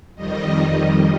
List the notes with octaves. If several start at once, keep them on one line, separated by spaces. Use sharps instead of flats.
F2 D#3 G3 D#5
D#5